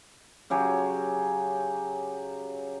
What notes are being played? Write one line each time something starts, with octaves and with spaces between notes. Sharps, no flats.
C#3 F#3 G4 G#4